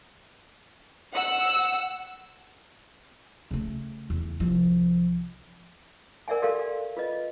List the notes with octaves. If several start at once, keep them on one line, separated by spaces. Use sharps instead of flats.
F#5 E6
C#3 A3
E2
C2 F3
A#4 D5 E5 F#5 G#5
F#4 G4 A4 A#4 D5 F5
F4 B4 D#5